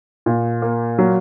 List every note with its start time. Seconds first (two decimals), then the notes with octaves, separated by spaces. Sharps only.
0.26 A#2
0.62 A#3
0.99 F#3